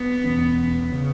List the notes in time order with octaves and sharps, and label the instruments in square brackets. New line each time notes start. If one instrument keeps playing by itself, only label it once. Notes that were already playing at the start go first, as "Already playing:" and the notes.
Already playing: [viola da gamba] B3
[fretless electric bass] E1 E2 E3 C#4
C#3